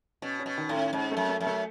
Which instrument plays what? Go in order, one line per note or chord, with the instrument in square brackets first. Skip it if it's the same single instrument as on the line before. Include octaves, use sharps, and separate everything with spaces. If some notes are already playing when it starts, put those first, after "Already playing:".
[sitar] B2 [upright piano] C#4
[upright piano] C#4
[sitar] B2
[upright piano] D#3
[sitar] A2
[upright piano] C#4
[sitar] G#2 [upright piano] C#4
[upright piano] A3
[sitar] F#2
[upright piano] A3
[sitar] F#2
[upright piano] A3